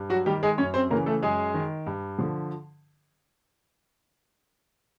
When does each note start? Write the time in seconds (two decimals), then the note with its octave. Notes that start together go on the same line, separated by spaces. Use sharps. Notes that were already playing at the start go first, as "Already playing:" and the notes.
Already playing: G2
0.10 F#3 F#4
0.26 D#3 G3 G4
0.43 G#3 G#4
0.58 F#2 C#4 C#5
0.74 C4 C5
0.90 C#3 E3 A#3 A#4
1.06 A3 A4
1.22 F#2 G#3 G#4
1.54 D#3
1.86 G2
2.19 D3 F3